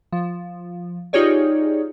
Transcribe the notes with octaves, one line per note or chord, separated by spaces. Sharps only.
F3
D#4 F4 G4 G#4 C#5 D5